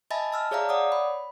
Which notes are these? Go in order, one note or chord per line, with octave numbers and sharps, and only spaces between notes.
D#5 E5 G#5 A5 B5 A6
A5 E6 F6
G#4 C#5 D5 E5 F5 A#5
C#5 D5 F#5 D6 D#6
B5